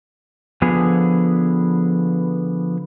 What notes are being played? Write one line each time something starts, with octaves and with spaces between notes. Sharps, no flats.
D3 F3 B3 G#4